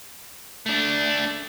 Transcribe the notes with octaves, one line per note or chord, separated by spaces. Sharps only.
A3 D4